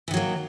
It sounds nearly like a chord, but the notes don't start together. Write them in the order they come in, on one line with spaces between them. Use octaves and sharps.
E3 D#3 F#3 A#3